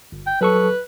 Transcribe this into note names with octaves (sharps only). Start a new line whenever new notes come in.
G1
G5
F#3 A4 B4 C#6